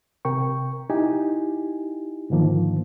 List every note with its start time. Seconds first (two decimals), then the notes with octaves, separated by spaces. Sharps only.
0.25 C3 A#4 G5 C#6
0.90 D#4 E4 G4 G#5
2.30 G#2 D3 D#3 F3 A#3